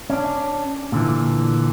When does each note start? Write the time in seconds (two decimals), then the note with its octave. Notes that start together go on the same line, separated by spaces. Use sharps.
0.10 C#4 D4
0.92 A#2 D3 E3